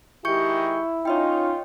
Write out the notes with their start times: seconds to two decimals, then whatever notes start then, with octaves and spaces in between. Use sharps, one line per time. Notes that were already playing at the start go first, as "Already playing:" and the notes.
0.25 D#3 G#3 E4 G4 C#6 G6 C#7
1.05 C#4 D#4 F4 C#5 D#5 G5